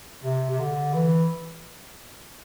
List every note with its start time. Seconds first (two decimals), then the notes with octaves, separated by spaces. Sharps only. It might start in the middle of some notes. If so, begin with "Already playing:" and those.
0.24 C3
0.50 C3
0.60 D3
0.94 E3